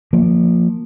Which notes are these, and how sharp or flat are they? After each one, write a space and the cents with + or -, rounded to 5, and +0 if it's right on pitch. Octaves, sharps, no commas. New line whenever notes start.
F3 +10 A#3 -10